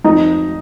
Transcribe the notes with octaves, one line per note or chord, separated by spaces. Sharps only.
F2 D#4